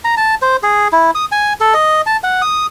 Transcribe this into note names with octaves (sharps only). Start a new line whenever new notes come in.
A#5
A5
C5
G#4
E4
D#6
G#5
A4
D#5
A5
F#5
D#6